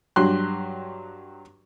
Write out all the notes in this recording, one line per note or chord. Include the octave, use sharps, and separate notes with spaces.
G2 F#3 G4 C6 F#6